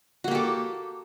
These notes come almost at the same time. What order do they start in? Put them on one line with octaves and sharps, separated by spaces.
F#4 A#3 G4 A4